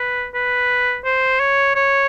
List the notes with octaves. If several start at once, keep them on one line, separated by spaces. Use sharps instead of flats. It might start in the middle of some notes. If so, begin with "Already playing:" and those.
Already playing: B4
B4
C5
C#5
C#5